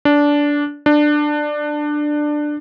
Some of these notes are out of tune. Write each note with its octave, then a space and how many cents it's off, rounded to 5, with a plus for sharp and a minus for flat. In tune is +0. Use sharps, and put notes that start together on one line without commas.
D4 -15
D4 +15